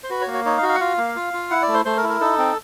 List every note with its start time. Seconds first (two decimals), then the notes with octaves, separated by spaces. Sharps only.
0.03 C5
0.10 F#4 B4
0.22 C#5
0.27 A#3
0.34 C#5
0.45 D#4 C#5
0.57 F5
0.63 F#4
0.69 F5
0.75 F#5
0.80 F4 F5
0.98 A#3
1.16 F4
1.33 F4
1.50 E4 F#5
1.62 D5
1.68 A3
1.74 C5
1.85 A3 C5
1.97 A#4
2.03 E4
2.09 A#4
2.21 D#4 A4
2.38 C4